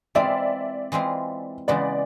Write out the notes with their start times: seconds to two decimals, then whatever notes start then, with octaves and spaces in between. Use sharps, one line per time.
0.15 E3 G#3 C4 F4 D5 E5
0.92 E3 G#3 C4 F4
1.68 C#3 E3 G#3 B3 D5